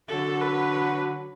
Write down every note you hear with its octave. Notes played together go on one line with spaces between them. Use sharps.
D3 F#3 A4
B4